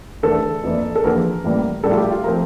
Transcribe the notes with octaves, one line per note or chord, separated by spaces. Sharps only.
E2 D3 A3 D4 A4
F2 E3 A#3 D4
A4
E2 D3 F3 A#3 A#4
A1 A2 E3 G3 A#3
A#1 A2 G3 A4
F4
G4
F4
F3 A3 C4 A#4